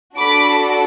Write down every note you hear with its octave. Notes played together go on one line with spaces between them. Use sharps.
D4 F#4 A4 B5 D6